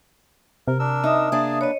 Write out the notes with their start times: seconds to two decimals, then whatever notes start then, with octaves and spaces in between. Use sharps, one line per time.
0.68 C3 A#4
0.79 D4 A#4 E6
1.04 D#4 E5 D#6
1.32 A#3 D4 G#4 G#5 A5
1.61 B4 C#5 D#5